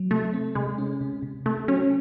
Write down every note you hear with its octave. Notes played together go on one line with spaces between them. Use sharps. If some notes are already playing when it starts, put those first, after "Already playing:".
Already playing: F#3
C3 A3
C4
C3 G#3
C#4
C3
C3
C3 A3
F#3 C#4